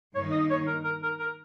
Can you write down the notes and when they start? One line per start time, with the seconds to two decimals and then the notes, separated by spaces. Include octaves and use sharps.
0.15 G2 D#3 A#3 D#4 C#5
0.32 D#5
0.50 C#5
0.67 A#4
0.84 A#4
1.03 A#4
1.20 A#4